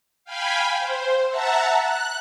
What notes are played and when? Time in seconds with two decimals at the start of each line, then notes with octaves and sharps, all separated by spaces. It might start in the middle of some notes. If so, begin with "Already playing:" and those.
0.24 F5 G5 G#5 B5
0.78 C5
1.28 E5 F#5 A5 A#5
1.79 F#6